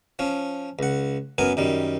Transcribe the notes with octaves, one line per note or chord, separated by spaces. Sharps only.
F3 C#4
C#2 F#5
F#2 B3 A#4 G#5
F#2 D#3 G3